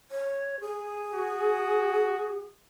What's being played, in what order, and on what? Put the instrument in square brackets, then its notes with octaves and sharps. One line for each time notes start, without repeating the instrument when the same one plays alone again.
[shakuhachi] C#5
G#4
[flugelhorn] F#4